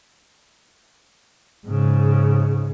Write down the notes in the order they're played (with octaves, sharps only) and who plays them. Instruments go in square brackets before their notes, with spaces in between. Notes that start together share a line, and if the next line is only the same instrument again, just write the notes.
[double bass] G#2 C#3